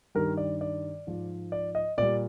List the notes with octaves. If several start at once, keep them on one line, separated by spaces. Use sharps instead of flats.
G2 D#3 G3 A#4
D5
D5
G#2 F3 G#3
D5
D#5
A#2 G3 D5